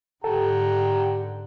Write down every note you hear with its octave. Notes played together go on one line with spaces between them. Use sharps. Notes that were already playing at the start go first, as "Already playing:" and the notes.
G#2 D3 G4 A4 F#5 G5 A#5